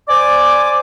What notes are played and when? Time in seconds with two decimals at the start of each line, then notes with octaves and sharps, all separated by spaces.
0.09 C5 D5 G#5 D6